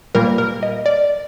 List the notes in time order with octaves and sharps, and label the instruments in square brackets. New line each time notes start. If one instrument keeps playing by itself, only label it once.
[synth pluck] A#2 G3 A#3 A#4
A#4
D#5
D5